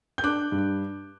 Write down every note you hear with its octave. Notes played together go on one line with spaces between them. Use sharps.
G6
D4 D6 F#6
G2